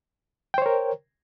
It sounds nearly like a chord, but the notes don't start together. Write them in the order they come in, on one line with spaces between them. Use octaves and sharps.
G5 C5 C#5 A#4